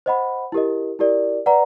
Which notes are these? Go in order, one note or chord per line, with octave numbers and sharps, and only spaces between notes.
C5 D#5 F#5 B5
E4 G4 A#4 D#5
E4 G4 A#4 D5
B4 D5 F#5 A#5